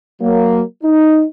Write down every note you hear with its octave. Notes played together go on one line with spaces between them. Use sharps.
F#3 A#3
D#4